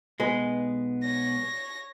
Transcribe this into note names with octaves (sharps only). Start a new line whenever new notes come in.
B1 G#3 B3 B4
C#5 A#6